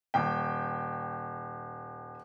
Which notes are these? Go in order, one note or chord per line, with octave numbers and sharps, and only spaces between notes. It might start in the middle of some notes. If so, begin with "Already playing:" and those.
D#1 G5